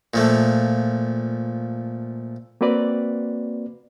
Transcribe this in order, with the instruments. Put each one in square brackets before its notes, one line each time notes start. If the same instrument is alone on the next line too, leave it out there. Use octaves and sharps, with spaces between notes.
[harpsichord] A#2 F3 A3
[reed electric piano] A#3 C4 F#4 B4 D5